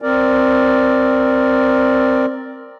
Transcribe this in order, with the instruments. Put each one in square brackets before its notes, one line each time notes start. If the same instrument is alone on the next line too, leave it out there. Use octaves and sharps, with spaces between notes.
[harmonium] C4 A#4 D5